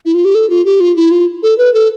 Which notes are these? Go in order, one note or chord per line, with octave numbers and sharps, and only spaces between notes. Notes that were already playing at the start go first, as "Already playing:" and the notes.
E4
F4
G4
A4
F4
G4
F4
E4
F4
A4
B4
A4